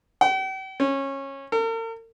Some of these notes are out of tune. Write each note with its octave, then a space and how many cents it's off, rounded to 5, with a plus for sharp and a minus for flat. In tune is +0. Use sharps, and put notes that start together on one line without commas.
G5 -45
C#4 -20
A#4 -45